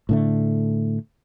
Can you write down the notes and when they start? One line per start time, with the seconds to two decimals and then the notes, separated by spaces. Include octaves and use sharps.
0.09 A2 D3 A3